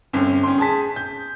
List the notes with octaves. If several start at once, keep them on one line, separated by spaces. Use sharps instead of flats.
G1 C4 C#4
C#4 G5 C6
G#4 G#5 A5 B6
G6